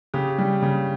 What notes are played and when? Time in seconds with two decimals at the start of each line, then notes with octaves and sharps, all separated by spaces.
0.14 C#3 G4
0.38 G3
0.62 C#3